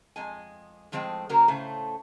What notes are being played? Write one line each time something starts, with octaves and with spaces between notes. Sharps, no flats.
F2 G#3 G#5
A2 F3 G#3 C4 G5
C#3 F#3 A#3 F#4 A#4 C5
A2 C#3 A3 C5